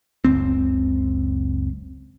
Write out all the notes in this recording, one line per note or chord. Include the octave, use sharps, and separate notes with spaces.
F#1 C#2 C4